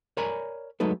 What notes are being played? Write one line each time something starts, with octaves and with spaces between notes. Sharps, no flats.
A#4 C#5 D5 G#5 A#5 B5
F#3 G#3 A3 D#4 A4 B4